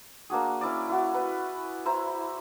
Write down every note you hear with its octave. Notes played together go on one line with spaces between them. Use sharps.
A#3 D4 F#4 G#4
C#4 E4 D5
E4 F#4
B4
E4 C5 A#5